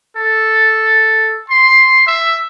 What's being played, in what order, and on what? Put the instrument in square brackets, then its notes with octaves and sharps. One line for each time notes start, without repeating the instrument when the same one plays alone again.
[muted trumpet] A4
C6
E5